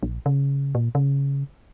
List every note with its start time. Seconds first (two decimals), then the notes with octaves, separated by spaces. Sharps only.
0.03 A#1
0.26 C#3
0.75 A#2
0.95 C#3